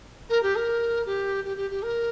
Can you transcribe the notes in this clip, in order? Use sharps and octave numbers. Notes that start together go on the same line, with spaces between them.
A#4
G4
A#4
G4
G4
G4
G4
A#4